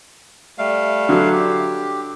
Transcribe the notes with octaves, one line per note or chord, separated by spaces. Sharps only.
G3 A3 F5
D3 F#3
G4